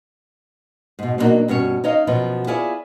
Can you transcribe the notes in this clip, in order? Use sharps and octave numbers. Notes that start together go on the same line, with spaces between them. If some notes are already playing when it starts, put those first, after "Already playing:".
G#2 B2
B2 F#3 G3 A#3 D4 D#4
G2 B2 C#4 C#5
D#4 C#5 D#5 F5
F#2 B2 F3 B3
E4 F4 G#4 C#5 D5